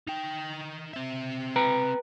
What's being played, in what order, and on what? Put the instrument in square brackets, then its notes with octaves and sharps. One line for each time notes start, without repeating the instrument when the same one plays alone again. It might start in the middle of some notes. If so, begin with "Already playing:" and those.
[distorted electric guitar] D#4 G5
C4 E5
[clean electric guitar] B4 G5 A#5